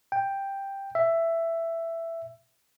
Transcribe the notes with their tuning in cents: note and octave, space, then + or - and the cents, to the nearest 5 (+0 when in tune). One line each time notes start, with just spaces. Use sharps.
G5 +5
E5 +10